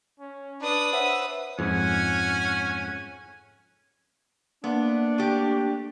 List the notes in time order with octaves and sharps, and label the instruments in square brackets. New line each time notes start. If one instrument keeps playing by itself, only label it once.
[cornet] C#4
[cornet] D4 [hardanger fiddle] B4 D#6
[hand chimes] C5 C#5 F#5 [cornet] E5
[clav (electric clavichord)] F2 G#2 [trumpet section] C#4 F#5 G#5
[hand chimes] A#3 F5 [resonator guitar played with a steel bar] B3 [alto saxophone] D4
[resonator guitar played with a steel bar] A3 G4